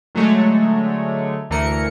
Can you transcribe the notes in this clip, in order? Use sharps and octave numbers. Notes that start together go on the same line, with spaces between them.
D3 F#3 G#3 A3 C#5
D2 E3 A3 A#3 A#4 C#7